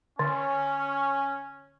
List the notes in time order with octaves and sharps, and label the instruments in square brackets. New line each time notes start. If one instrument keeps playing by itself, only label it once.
[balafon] D3 [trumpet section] C#4